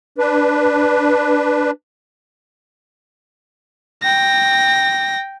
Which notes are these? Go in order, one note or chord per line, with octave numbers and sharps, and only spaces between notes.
D4 B4
G5 A#6